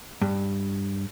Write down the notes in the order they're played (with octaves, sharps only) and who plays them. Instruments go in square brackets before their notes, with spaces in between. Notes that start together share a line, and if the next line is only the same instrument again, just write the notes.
[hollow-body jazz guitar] G2